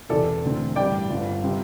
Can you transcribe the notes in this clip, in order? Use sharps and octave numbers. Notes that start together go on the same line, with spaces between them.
E1 E2 C3 A4 D5
E1 D2 D3 C4
A1 G2 G3 D5 G5
G1 G2 G3 C4
C3 G3 C4